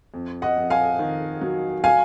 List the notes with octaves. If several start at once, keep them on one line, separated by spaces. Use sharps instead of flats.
F2
D#5 F#5
F2
F5 G#5
D#3
F#3
F5 G#5